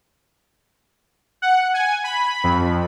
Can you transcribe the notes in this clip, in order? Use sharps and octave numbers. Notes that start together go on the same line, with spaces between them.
F#5
G#5
B5
F2